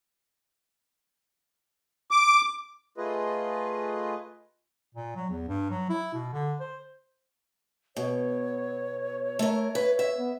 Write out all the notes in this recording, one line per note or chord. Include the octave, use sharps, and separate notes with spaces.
D6
A3 F4 G#4 B4 D#5
A#2
F#3
E2
G2
F#3
E4
B2
D3
C5
B2 C#5
A3 A#4
B4
E5
B3